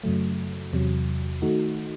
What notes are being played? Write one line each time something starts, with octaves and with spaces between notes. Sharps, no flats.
F#2 C#3 F#3 A3
E2 C3 F#3
D#3 A3 D#4 F#4